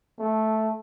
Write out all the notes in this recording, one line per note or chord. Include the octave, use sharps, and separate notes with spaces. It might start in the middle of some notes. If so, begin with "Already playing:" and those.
A3